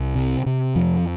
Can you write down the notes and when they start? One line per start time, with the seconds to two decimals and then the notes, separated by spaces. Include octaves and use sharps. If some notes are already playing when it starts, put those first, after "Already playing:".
Already playing: C2
0.15 C3
0.46 C3
0.75 F2 F3